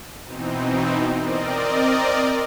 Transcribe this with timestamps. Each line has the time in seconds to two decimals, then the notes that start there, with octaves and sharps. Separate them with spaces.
0.24 B2 E3 C4 D#4
1.15 C4 A#4 D5 D#5